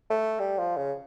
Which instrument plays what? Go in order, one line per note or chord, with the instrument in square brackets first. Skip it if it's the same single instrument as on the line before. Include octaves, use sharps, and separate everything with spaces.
[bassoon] A3
G3
F3
C#3